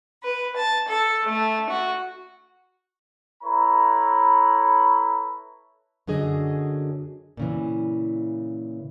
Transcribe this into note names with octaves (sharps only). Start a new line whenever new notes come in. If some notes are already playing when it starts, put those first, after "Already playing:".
B4
A5
A4
A3
F#4
E4 A4 B4 C#5 A#5 B5
F#2 D3 F#3 G#4 D#5
A#2 C#3 E3